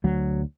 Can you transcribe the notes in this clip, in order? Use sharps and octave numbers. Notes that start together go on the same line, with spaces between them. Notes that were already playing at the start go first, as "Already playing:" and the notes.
D2 F#3